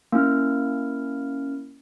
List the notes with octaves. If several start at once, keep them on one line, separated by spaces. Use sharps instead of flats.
A#3 C#4 E4 F6